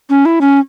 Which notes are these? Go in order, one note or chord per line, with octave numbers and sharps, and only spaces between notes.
C#4
E4
C#4